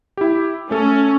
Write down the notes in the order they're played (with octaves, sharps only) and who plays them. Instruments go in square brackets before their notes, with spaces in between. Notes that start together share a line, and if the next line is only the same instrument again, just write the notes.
[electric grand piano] E4 G4
[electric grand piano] A3 A4 [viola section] C#4